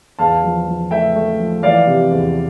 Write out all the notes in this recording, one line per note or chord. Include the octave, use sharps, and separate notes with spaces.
E2 F5 A5
F3
F3
A3 E5 G5
A3
F3
E3 D5 F5
C3
E2